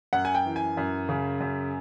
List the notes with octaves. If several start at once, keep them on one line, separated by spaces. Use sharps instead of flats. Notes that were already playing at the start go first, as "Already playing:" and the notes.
F#2 F#5
G#5
G5
E3
G#5
F#2
C#3
F#2